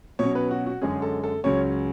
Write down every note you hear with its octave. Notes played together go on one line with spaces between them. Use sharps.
B2 F#3 C#4 C#5
B4
F#4
F#4
F#2 D3 G#3 C#4 G#4
A4
A4
C#2 C#3 F#3 C#4 C#5